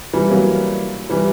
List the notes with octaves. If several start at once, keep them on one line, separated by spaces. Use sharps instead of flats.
E3 G3
F#3 A#3
E3 G3